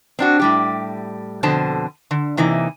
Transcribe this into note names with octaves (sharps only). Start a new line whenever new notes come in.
C4 D4 F#4
A2 G3 G4
F2 B2 D3 C5 A5
D3
C3 E3 A#3 D#4